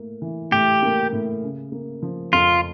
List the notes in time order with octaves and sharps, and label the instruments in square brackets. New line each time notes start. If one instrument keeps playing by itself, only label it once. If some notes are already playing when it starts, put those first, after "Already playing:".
Already playing: [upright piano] A2 A#3
E3
[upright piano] A2 [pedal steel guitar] G4
[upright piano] A#3
A2
C#3
A#3
F3
[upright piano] F2 [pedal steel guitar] F4